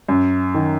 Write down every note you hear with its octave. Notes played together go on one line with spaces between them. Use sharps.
F#2
D#3